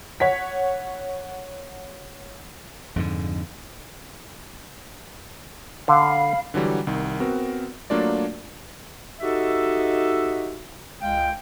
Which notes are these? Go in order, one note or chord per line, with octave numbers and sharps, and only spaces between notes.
C#5 F#5 B6
F2 G#2 D3
D3 F5 B5
D3 E3 F#3 G3
C2 D#3
B3 C4 F#4 A#4
F#3 A3 A#3 D4 F4 D5
D#4 F#4 G4 A4 D#5 E5
C#2 G#3 F5 G5